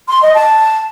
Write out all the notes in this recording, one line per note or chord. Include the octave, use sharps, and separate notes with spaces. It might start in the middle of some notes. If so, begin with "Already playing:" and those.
C6
D#5
A5